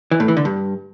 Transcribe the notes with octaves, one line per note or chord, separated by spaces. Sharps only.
E3
A2
E3
D3
G2